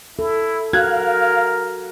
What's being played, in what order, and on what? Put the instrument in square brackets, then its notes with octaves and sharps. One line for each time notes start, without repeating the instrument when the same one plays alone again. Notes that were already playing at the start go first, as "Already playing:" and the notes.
[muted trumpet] E4 [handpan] A4
[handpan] F#4 [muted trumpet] A#4 [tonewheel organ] F5 [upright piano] F#6 G#6